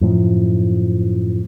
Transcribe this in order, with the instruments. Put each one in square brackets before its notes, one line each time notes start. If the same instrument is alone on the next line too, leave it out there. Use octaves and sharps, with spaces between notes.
[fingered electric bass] F#2 A2 F3